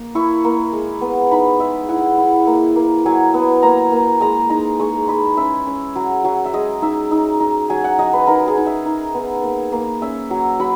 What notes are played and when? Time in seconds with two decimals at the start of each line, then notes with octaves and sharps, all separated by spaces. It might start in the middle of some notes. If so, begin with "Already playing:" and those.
Already playing: A#3
0.15 E4 C#6
0.44 A#3
0.73 G#3
1.01 B3
1.31 D#4 B5
1.59 G#3 E5
1.89 E4 F#5
2.18 E4
2.47 A#3
2.76 A#3
3.06 F#3 G#5
3.34 B3
3.63 A#3 A#5
3.92 A#3
4.21 G#3 A#5
4.50 D#4 A#5
4.79 G#3 C#6
5.08 G#3 B5
5.37 C#4 E5
5.67 C#4
5.96 F#3
6.24 F#3
6.45 E5
6.54 G#3 D#5
6.82 D#4 E5
7.11 D#4
7.40 D#4
7.70 F#3 G#5
7.84 F#5
7.99 F#3 D#5
8.13 B4
8.27 D#4 A#4
8.48 G#4
8.57 D#4
8.67 E5
8.86 D#4
9.14 B3
9.43 A#3
9.72 A#3
10.02 C#4 E5
10.31 F#3
10.60 F#3 B5